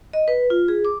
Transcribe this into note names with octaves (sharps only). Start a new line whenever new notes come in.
D#5
B4
F4
G#4
D6